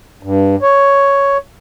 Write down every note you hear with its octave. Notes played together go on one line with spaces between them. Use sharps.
G2
C#5